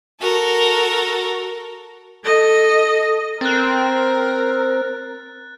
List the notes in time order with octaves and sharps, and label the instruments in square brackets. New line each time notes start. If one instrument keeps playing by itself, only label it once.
[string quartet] F#4 A4 A#4
[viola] A4 D#5
[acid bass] C4 [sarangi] A#4 [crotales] F#6 A6